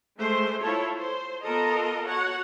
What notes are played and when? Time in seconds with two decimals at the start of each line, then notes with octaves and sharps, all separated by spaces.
0.18 G#3 A3 C5
0.62 E4 F4 A4 C#5
0.95 C5
1.43 B3 F4 A4 A#4 D#5 A#5
2.08 F#4 C#5 F#5